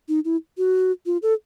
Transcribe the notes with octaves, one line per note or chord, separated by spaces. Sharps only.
D#4
E4
F#4
F4
A4